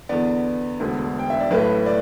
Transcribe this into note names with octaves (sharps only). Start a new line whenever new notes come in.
E2 D3 B3 D5
E1 D2 D3 B3
G5
E5
D5
B1 A2 A3 B4
D5